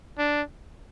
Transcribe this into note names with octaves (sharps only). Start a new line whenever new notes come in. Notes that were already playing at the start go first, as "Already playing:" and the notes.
D4